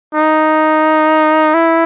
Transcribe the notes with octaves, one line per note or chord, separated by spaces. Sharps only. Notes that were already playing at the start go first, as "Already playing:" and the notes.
D#4
E4